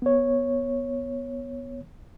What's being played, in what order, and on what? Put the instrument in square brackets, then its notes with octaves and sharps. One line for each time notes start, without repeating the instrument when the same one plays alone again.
[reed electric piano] B3 C#5